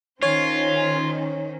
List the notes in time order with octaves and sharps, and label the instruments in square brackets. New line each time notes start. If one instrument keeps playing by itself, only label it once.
[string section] D#3 C#4 C5 [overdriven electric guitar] F4 [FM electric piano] C#5 [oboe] G#5